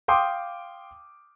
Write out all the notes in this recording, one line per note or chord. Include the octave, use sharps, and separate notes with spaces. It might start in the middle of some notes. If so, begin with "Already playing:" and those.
F5 G5 C6 D6 D#6